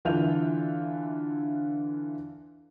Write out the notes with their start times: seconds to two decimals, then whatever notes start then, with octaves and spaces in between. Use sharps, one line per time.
0.05 D3 E3 F4 E5 G6 F7